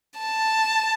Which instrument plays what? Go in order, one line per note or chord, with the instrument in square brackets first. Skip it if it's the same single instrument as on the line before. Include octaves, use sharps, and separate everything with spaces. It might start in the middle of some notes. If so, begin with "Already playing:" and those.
[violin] A5